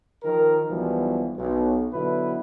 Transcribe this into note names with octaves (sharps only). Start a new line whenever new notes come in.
D#3 F3 A#4
B1 B2 E3 F3 G3
B1
B2 D3 F#3 E4 B4